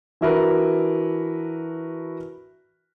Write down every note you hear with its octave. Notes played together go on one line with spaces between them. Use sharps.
E3 D4 E4 F#4 A#4 B4